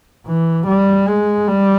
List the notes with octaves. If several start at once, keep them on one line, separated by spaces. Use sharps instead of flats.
E3
G3
G#3
G3